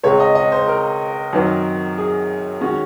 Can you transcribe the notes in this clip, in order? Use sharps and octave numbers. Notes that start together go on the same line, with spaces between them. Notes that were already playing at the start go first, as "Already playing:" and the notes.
C#2 C#3 G#3 C4 C#5
D#5
D#5
C5
A#4
F#2 D#3 F#3 C4 D#4
G#4
D#3 G#3 C#4 F#4